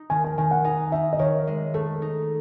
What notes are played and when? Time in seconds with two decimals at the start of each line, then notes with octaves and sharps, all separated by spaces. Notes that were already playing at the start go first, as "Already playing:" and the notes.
Already playing: D#4
0.10 D#3 G#5
0.24 G#5
0.38 D#3 G#5
0.51 F#5
0.64 D#4 G#5
0.92 D#4 E5
1.13 D#5
1.19 D#3 C#5
1.47 G#3
1.74 A3 A4
2.02 D#4